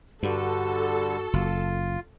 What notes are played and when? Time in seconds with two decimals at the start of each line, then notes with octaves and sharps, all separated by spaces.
0.23 G2 D3 G3 F#4 A4
1.33 F#1 F4